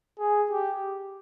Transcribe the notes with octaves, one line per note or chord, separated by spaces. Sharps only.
G#4
G4